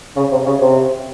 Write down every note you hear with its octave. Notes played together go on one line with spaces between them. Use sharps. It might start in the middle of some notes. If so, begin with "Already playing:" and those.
C#3
C3
C#3
C3